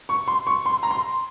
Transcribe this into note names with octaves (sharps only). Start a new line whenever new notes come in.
C#6
C6
C#6
C6
A#5
C6